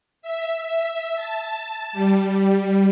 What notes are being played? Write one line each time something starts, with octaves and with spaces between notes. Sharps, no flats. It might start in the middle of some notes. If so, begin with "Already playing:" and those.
E5
A5
G3